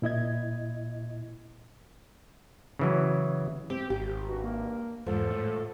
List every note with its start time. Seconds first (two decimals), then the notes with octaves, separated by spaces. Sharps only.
0.02 A#2 E4 D#5 G#6
2.79 C#3 E3 F#3
3.70 C4 G4
3.90 G#1 G4
4.28 G2 F#4
4.43 A#3
5.06 E2 G#2 F3 A4
5.30 A2